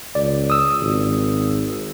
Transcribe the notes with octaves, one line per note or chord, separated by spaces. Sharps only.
C#2 D5
D#6 E6
G#1